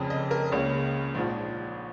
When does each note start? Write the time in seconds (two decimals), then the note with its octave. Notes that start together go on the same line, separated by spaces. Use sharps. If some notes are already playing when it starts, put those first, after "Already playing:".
Already playing: F1 F2 C#3
0.10 D#5
0.31 A#4
0.52 C#2 C#3 A#3 C#5
1.15 A#1 G#2 F3